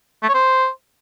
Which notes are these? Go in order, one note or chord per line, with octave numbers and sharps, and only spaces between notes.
A3
C#5
C5